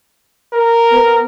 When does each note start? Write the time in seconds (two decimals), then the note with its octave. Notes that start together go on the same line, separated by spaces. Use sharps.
0.53 A#4
0.92 B3